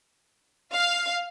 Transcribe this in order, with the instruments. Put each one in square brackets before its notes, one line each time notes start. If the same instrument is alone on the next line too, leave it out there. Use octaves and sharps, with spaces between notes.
[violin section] F5